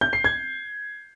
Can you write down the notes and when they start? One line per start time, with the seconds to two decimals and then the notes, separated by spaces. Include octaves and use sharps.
0.01 G6
0.13 C7
0.24 G#6